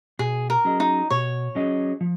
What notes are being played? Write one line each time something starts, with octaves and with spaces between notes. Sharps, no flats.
B2 G#4
A#4
F#3 C#4 G#4 D#5
D#4
B2 C#5
F#3 C#4 G#4 D#5
F3